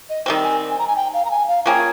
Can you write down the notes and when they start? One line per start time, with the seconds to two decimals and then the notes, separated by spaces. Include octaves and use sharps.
0.09 D#5
0.26 D#3 G3 C4
0.44 G#5
0.70 G#5
0.79 A#5
0.87 G#5
0.96 G5
1.14 F5
1.25 A#5
1.31 G#5
1.48 F5
1.66 F3 A#3 C#4 G#4 G5